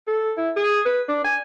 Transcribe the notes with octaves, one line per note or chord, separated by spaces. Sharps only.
A4
E4
G#4
B4
D4
G#5